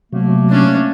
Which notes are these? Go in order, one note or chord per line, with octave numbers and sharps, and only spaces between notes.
C3 F#3 A3 A#3
C#4 D4